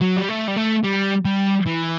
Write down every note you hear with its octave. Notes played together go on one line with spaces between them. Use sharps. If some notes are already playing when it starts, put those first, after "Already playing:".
F#3
G3
A3
G3
A3
G3
G3
E3